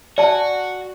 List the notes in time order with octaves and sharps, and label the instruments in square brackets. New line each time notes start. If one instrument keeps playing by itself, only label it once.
[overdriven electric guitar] F#4 [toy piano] D5 G#5 A5